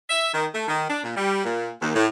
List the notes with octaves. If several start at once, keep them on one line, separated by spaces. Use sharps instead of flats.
E5
D#3
A3
D#3
D4
A#2
G3
A#2
D#2
A2